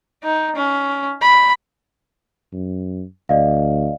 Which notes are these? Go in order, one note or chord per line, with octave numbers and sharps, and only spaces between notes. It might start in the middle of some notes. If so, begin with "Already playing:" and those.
D#4
C#4
B5
F#2
D2 D5 D#5 F5